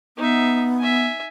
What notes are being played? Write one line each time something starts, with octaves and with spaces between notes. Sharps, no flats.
B3 D#4 E5
E5 G#5